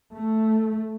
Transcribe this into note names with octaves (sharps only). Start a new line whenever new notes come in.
A3